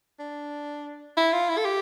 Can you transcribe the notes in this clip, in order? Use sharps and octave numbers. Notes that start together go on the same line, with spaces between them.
D4
E4
F4
E4
A4
G4